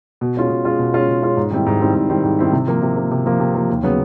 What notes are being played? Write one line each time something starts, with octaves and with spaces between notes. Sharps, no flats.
B2
G#3 C#4 F4
B2
G#3 C#4 F4
B2
G#3 C#4 F4
B2
G#3 C#4 F4
G#2
D#3 G3 C4 E4
G#2
D#3 G3 C4 E4
G#2
D#3 G3 C4 E4
G#2
D#3 G3 C4 E4
C3
F3 A#3
C3
F3 A#3
C3
F3 A#3
C3
F3 A#3
D#2
C#3 F#3 B3